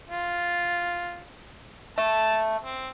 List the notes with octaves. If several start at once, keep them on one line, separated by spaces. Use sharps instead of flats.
F4
A3 A5
C4